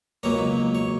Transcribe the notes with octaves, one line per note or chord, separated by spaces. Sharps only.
C#2 B2 F#3 A#3 C#5
C#5